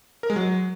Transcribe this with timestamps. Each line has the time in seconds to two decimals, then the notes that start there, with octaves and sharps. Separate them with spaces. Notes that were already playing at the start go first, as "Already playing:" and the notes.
0.23 A#4
0.30 G#3
0.36 F#3